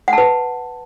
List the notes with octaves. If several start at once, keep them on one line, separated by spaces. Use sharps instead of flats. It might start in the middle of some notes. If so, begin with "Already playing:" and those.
F#5
A5
B4